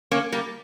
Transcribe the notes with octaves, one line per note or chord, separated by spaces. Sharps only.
A#3 C#4
G3 A#3